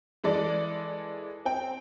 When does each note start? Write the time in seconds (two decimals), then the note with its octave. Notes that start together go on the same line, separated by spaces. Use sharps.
0.24 E3 G#3 A4 D5
1.45 C4 G5